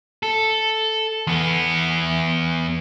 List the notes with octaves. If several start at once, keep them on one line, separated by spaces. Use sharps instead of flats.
A4
E2 B3